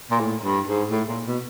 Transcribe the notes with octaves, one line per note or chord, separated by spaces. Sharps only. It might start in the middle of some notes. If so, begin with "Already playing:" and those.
A#2
A2
G2
G#2
A2
A#2
B2